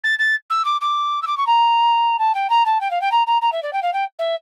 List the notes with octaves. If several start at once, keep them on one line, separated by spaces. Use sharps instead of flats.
A6
A6
E6
D6
D6
E6
D6
C#6
A#5
A5
G5
A#5
A5
G5
F5
G5
A#5
A#5
A#5
E5
D5
G5
F5
G5
E5